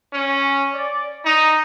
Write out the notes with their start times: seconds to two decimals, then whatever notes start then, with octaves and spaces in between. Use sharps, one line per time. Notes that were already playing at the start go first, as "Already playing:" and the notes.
0.13 C#4
0.74 D5
1.25 D#4